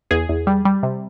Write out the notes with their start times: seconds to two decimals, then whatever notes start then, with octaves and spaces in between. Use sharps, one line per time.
0.11 E2 G#4
0.29 E2
0.47 G3
0.65 G3
0.83 C3